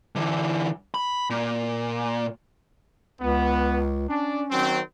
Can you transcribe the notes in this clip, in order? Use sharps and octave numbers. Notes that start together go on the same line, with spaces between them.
D3 E3
B5
A#2
C#2 B3
C#4 D4
D#3 F#3 C4